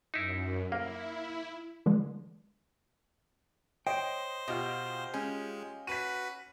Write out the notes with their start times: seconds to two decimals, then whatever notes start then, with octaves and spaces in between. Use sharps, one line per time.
0.14 F#2 D#4 E4
0.72 A#3 E4 F5
1.86 D3 E3 G#3
3.87 C5 C#5 D#5 G5
4.48 B2 F4 G4 D#5
5.14 G#3 C#4
5.87 F#4 B4 B6 D#7